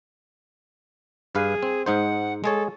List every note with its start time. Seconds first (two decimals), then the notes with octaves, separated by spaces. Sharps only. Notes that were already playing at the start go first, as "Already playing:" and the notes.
1.35 G2 G#4 B4 F5
1.63 C4
1.86 G#2 D#4 C5 F#5
2.44 G#3 G#4 A4 C#5